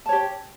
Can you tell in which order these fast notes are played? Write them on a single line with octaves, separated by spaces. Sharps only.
A5 C#5 G4